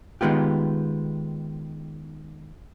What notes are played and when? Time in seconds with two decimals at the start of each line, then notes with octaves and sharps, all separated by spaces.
0.21 D#3 G#3 B3 F4 G4